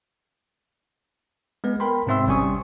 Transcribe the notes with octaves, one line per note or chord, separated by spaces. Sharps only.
G#3 B3 B4
A#4 G5 B5 C6
G#2 C3 C4 E5 C6 E6
G#1 G3 C#4 G#5 C#6 D#6